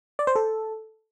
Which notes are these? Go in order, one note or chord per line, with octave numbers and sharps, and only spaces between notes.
D5
C5
A4